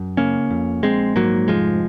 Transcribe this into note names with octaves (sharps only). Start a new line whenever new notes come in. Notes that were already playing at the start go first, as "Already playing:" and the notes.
Already playing: F#2
C#3 A#3 C#4
F2
A#1 G#3 C4
G#2 F#3 A#3
F1 F3 G#3